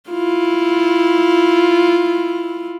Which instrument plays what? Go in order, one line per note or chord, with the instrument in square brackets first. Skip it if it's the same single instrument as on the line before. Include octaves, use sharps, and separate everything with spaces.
[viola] E4 F4